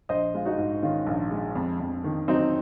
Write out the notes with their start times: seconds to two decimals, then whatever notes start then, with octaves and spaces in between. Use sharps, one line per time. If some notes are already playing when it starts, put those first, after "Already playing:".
0.09 A#1 C5 D#5
0.34 G#3 F4
0.45 D#4 F#4
0.58 G#2
0.82 D#3 C#4 F4
1.06 A#1
1.31 G#3
1.55 F2
1.80 F2
2.04 D#3
2.28 F#3 C4 D#4